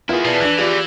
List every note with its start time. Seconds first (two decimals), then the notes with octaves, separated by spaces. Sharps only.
0.09 B3 E4 F4 G#4 A#4
0.25 B2 B4 D5 A5
0.40 E3 D4 F#6
0.58 F4 G4 G#4 D5